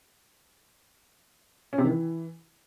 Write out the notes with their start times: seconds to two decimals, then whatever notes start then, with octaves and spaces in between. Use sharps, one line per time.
1.73 C#4
1.78 C3
1.84 D#3
1.89 E3